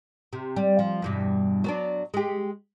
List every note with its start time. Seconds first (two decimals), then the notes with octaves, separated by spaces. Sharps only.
0.33 C3
0.56 G3
0.79 F3
1.02 E2 G2 B2
1.64 F#3 B3 D4
2.14 G#3 G4